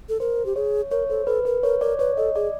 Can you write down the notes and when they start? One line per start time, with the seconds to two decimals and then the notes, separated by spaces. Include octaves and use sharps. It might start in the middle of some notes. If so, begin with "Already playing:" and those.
0.09 A4
0.20 A#4 C5
0.46 G4
0.56 G#4 C#5
0.91 A#4 C#5
1.10 A4 C5
1.27 A4 B4
1.45 A#4 B4
1.63 A#4 C#5
1.81 A#4 D5
1.99 B4 C#5
2.17 A4 D#5
2.35 G#4 D5